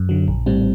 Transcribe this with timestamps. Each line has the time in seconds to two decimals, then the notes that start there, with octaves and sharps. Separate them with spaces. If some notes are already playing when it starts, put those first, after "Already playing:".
Already playing: F#2
0.09 D3 F#3
0.28 A#1
0.46 A2 G3 C4